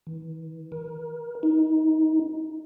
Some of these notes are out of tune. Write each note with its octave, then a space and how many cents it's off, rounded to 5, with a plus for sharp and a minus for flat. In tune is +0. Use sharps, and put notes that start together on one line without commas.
E3 -40
A#4 +25
D#4 +20